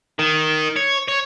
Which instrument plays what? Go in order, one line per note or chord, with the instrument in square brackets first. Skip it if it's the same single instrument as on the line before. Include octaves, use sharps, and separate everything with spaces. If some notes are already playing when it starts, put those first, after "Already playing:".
[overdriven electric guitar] D#3
C#5
C#5